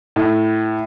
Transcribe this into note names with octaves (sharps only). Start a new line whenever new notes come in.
A2